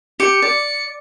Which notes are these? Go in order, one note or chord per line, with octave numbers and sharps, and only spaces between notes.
G4 C#7
D5